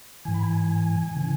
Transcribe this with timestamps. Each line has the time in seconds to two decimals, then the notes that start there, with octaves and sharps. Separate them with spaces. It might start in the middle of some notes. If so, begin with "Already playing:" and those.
0.25 G#2 E3 G#5
0.34 B5
0.42 G#5
1.13 C#3 E3 G#5